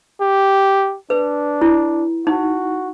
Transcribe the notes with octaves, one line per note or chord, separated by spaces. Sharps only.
G4
D4 B4
E4
D#4 F#4